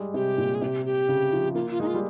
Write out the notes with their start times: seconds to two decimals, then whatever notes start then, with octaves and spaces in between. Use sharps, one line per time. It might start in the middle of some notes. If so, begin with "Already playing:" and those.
Already playing: G3 G#3
0.14 C3 G4
0.38 A#2
0.55 G#4
0.62 C3 G4
0.86 G4
1.09 C#3
1.33 F3
1.55 A#3 F4
1.71 F4
1.80 G#3 D#4
1.87 F4
1.94 G3